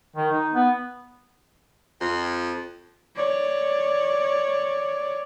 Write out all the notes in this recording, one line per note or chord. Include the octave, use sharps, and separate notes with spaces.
D#3
D#4
B3
F2
C#5 D5